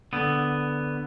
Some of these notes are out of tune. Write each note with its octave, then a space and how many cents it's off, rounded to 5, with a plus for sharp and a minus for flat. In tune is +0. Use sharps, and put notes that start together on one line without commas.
D3 +0 B3 +5